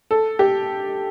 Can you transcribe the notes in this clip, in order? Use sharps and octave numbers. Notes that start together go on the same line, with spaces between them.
A4
G4